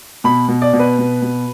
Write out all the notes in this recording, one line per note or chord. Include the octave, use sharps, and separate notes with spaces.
B2 B5
B2
D5
B2
B4
B2
B2